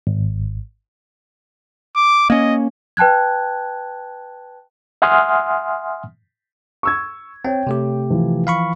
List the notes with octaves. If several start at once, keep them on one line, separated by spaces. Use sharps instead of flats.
G#1
D6
A#3 C#4 D#5
B4 G5 A5 F#6 G#6
E5 F#5 G#5 C6 D#6 F6
C#6 E6 G#6
C4 C#5 G5
C3 A3 G4
E3 F3
F5 B5 C#6